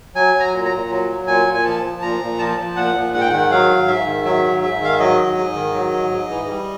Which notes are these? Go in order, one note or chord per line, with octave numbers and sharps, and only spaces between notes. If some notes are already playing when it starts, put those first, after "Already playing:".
F#3 G#5
F#3
A#5
A#2
A#5
A#2
F#3
F#3
A#2 G#5
A#2
G#5
F3 A5
F3
A#2 A#5
A#2
F3 A5
F3
A#2 F#5
A#2
G#2 F#5
G5
D#3 F#5
F#3 F5
G#2
G#2 E5
D#3
F#3 E5
G#2
G#2 E5
D#3 F5
E5
F#3 D#5
G#2
G#2
D#3
F#3
G#2
G#2
E3
G3